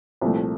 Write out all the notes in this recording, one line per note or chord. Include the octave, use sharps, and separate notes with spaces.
C2 A#2 F3 A3